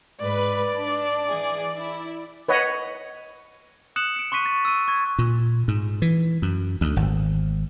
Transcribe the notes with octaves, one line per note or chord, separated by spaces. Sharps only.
G#2 B4 D5
D4
E3 G#4
E4
B4 C#5 D#5 F#5
D#6 F#6 C#7 E7 F#7
C#7 D7
C6 C#6 F#6 B6 D#7
A6
E6 D#7
C#6 G#6 A6
A#2
G#2
E3
F#2
D2
G#1